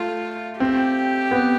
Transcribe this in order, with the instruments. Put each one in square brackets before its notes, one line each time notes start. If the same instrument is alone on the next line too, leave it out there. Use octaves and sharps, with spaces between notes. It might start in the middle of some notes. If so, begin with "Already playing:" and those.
Already playing: [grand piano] A3 [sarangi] F4
[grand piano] C4 [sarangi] G4
[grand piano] B3